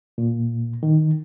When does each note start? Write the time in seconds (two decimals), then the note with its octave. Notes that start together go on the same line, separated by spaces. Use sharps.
0.18 A#2
0.83 D#3